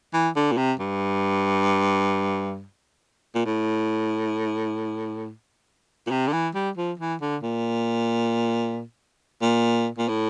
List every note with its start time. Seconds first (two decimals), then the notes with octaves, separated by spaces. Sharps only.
0.14 E3
0.36 D3
0.52 A#2
0.57 C3
0.80 G2
3.35 A#2
3.46 A2
6.07 A#2
6.11 C3
6.28 D3
6.33 E3
6.55 G3
6.77 F3
6.99 E3
7.21 D3
7.43 A#2
9.42 A#2
9.98 A#2
10.09 A2